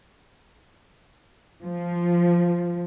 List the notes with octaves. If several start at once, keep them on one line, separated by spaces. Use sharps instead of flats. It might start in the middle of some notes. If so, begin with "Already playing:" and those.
F3